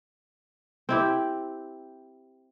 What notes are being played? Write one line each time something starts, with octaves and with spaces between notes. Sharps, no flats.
C4 E4 G4